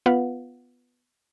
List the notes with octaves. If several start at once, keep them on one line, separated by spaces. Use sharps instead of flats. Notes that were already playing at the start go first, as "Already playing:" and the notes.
B3 F4 B4 F5 F#5